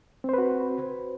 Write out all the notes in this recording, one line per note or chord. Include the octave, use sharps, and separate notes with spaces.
C4 F#4 B4 C5